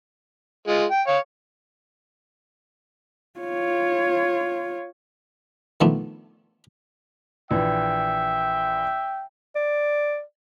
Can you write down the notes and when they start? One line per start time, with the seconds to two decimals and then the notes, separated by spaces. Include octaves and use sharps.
0.68 G#3 F4
0.91 G5
1.07 C#5 F5
3.40 F4 C#5
5.81 D#3 F3 A3 B3 D4
7.51 A#1 E3 E5 G5
9.56 D5